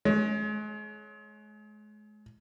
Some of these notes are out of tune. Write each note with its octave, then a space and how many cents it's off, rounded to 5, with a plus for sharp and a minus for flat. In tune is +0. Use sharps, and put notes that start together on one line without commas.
G#3 +35 C#4 +0